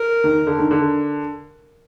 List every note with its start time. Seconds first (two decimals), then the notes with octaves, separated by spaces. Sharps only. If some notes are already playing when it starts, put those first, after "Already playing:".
Already playing: A#4
0.24 D#3
0.47 D3
0.59 D#3
0.71 D3